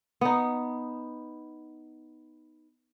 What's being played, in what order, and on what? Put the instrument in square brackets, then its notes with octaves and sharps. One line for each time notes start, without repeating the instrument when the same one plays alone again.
[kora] B3 D#4